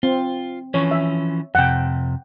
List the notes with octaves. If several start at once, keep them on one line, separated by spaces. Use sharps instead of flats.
C4 F4
E3 F3 C#4 C#5
E5
F2 C3 F#5 G5